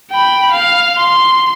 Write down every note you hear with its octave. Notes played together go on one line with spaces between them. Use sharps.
G5 B5
F5
C6